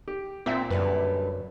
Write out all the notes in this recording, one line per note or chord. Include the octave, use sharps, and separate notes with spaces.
G4
A#2 C4 E5
F#2 D3 G3 B4